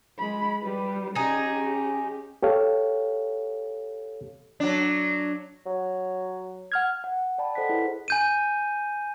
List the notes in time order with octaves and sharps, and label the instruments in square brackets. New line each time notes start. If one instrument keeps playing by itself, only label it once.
[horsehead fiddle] G#3 B5
G3 B4
[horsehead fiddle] C#4 G4 [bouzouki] D#4 G#4
[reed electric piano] G4 A4 C#5 F5
[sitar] F#3 D4
[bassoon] F#3
[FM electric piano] F#5 F6 G#6
[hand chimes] F#5
D5 G5 A5 B5
A4 C5 D#5 F#5 B6
E4 G#4 B4
[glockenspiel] G#5 G6 D#7